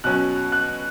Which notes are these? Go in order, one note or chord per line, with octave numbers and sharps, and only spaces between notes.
B2 F#3 C#4 F#6
F#6